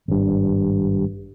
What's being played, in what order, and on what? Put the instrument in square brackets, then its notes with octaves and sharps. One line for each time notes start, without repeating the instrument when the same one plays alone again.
[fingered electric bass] G#1 G2